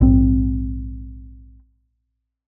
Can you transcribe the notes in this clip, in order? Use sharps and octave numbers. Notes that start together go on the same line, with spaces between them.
A#1 G#2 C4